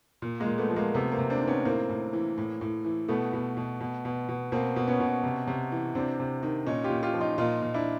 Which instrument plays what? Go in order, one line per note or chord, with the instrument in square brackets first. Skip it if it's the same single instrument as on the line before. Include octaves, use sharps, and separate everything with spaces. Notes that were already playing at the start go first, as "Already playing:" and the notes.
[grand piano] A#2
G#3 A#3
A#2
A3 B3
F3
G#3 A#3
C3 A3 B3
A#3 C4
C3
C4 D4
D#3
B3 C#4
A2 A#3 C4
A2
E3
A2
A2
E3
B2 A3 B3
B2
B2
B2
B2
B2
B2 A#3 C4
B2
B3 C#4
B2
C3
C3
E3
C3 C4 D4
C3
D#3
A#2 C#4 D#4
F4 G4
A#2
F4 G4
F3
D#4 F4
A#2 D#4 F4
A#2
D4 E4